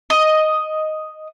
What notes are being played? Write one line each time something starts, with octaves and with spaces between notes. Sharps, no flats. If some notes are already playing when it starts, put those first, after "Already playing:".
D#5